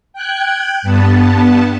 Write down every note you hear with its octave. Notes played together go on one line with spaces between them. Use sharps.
G5 F#6 G#6
G2 B3 A5